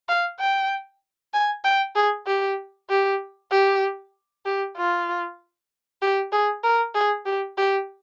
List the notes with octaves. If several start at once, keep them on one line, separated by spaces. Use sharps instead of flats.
F5
G5
G#5
G5
G#4
G4
G4
G4
G4
F4
G4
G#4
A#4
G#4
G4
G4